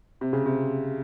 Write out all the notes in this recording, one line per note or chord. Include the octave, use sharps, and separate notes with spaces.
C3
C#3
C3